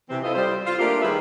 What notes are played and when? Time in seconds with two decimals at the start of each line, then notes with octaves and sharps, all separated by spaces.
0.10 C3 E3 C4
0.24 E4 F4 A4 C5 D#5 F5
0.35 G3 C5
0.65 F4
0.79 A3 A#3 D4 F4 G4 A#4
1.02 D#3 G3 G#4 B4 E5